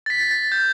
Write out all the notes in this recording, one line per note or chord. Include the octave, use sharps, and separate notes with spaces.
A6
B6
A6
G6